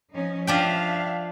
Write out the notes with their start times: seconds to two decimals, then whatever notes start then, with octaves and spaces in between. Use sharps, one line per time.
0.14 F3 C#4 D#4
0.47 F3 D4 E5 F5 G5